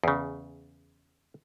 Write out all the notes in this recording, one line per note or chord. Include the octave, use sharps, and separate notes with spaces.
E2 C#3